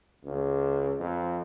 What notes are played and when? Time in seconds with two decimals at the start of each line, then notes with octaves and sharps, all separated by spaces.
0.25 C#2
1.00 F2